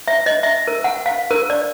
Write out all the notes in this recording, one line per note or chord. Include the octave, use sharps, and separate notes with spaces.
E5
D#5
E5
A#4
F#5
F5
A#4
D5